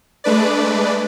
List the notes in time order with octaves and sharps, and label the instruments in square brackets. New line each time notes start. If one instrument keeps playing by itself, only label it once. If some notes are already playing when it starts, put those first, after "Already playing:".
[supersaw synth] G#3 A3 D4 B4 D5